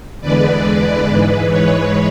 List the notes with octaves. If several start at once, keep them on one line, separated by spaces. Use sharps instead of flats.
E2 D3 G#3 B4 D5
G#2 E3 G#3 B4
C#5